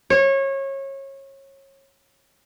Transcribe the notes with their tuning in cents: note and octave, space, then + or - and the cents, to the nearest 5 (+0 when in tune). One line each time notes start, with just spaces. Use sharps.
C#5 -25